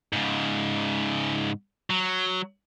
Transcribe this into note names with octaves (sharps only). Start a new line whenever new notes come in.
G#2 C#3
F#3